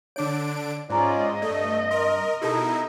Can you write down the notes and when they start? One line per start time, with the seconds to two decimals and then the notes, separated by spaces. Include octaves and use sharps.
0.16 D3 D4 C#5 D6 D7
0.90 G#2 C#4 F4 C5 D5 D#5 A#5
1.42 G2 A3 D5
1.91 A#4 C6
2.42 B2 D#4 E4 G4 A4 A#4 A5